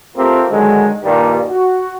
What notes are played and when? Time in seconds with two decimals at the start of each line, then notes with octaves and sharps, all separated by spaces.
0.17 A3 C4 F4 G4 A#4
0.50 D3 D#3 F#3 G#3
1.04 G2 A#2 D#3 G3
1.49 F#4